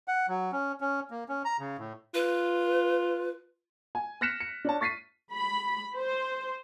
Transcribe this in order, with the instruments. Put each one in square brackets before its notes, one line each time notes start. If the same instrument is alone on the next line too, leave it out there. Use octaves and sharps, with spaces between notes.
[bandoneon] F#5
F#3
C#4
C#4
A#3
C#4
A#5
C#3
A2
[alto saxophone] F4 [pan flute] B4
[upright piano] G#5
F6 F#6 A#6 B6 C#7 E7
C#7
D4 C#5 A5
C#6 A6 B6 C7 D#7
[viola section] B5
C5